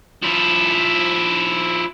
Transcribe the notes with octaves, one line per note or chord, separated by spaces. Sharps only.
F3 E4